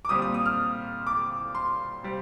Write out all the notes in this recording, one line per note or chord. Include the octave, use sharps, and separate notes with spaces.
D6
A#2 G3 C4 D#6
D#6
D#6
F6
D6
C6
C3 G3 C4